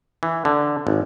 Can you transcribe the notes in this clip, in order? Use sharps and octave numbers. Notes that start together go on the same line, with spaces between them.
E3
D3
G#1